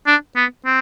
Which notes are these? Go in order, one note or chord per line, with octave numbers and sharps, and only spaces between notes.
D4
B3
C4